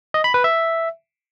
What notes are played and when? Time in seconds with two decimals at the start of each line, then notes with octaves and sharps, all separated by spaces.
0.14 D#5
0.24 B5
0.34 B4
0.44 E5